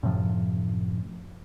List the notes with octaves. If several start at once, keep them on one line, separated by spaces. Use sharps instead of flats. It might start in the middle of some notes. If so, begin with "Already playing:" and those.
F#2 A2 C3 F3